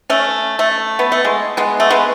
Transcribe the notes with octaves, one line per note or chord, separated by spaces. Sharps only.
A3 C#4
A3
B3
A3
G#3
G#3 B3
A3
G#3 B3